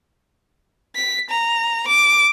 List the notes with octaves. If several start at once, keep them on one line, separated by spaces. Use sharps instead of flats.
B6
A#5
D6